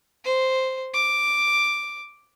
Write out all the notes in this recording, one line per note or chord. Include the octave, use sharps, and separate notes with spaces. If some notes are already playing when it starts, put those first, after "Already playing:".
C5
D6